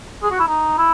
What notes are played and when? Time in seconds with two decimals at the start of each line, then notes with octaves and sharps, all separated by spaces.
0.23 G#4
0.31 F#4
0.40 E4
0.48 D#4
0.78 E4